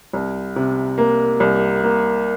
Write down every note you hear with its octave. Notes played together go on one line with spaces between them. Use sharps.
C2
C3
A#3
C2
A#3